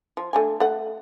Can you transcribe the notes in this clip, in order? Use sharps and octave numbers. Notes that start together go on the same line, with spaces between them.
F3
A3 D4 G#5
A3 F#5